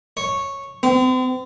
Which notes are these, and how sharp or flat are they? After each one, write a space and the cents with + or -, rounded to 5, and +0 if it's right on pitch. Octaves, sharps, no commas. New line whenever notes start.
C#5 -5
C4 -40